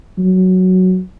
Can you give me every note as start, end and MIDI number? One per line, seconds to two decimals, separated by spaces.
0.18 1.01 54